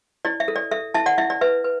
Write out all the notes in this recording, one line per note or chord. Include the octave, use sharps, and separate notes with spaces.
E4 D5
E5
A4
D5
A4 E5
E4 E5 A5
D5 F#5
E4 E5
D5
B4 E5
B4